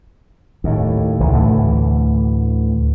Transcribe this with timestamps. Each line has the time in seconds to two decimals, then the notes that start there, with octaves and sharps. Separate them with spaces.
0.64 D#2 A2
1.20 C2 E3
1.32 D2 A2 D3 E3